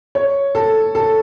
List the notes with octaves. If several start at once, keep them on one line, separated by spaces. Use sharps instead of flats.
C#5
A4
A4